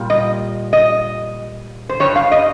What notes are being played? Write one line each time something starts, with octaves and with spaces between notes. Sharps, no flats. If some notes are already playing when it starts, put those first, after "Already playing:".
Already playing: A#2 G3
D#5
D#5
C5
G2 G3 C#5
F5
D#5